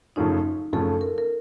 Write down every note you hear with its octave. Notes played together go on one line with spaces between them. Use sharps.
F#2 C#3 F3 A3 C#4 D#4
F#2 C#3 F3 A3 C#4 A4
A#4
A#4